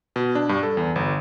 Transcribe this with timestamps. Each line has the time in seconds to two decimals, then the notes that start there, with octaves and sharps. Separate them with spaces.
0.16 B2
0.35 D4
0.49 G2
0.63 A4
0.77 E2
0.96 G1